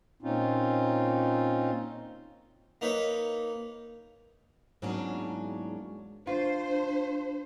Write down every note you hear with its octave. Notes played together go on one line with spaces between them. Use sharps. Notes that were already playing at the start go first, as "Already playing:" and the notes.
A#2 C4 C#4 D#4 F4
A#3 D#4 B4 C#5
E2 G#2 F#3 A#3 C#4 D4
D4 F4 C5